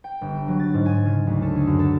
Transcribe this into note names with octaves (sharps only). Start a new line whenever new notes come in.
G5
G1
F#3
A6
G#2
G#5
C#3
D2
A4
G#4
F#2
A4